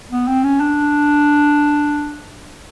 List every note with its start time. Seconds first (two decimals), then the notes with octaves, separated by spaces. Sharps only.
0.11 B3
0.28 C4
0.44 C#4
0.60 D4